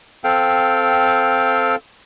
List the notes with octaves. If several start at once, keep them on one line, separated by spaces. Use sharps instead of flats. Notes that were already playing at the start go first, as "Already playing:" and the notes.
C4 A4 F5 G5